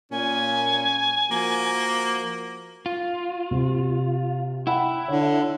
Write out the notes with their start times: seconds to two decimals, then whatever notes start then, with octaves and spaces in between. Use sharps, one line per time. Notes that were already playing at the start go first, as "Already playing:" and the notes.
0.12 A#2 C#4 G#5
1.31 F3 A#3 F#4 A#4
2.86 F4
3.51 C3
4.67 E4 F#5 G5 B5
5.08 D3 C#5